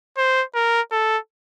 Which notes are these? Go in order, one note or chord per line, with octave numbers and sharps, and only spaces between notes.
C5
A#4
A4